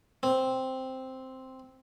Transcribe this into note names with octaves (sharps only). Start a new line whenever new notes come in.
C4